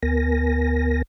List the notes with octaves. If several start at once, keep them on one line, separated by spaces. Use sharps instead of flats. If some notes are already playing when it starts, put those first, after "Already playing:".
D2 B3 A#4 G#5 A#6